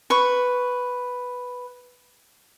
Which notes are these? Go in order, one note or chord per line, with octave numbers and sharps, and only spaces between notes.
B4 C#6